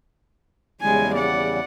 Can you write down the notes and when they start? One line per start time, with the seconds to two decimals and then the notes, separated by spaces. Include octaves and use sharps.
0.81 E2 C#3 G3 G#3 G#5
1.15 D5 F#5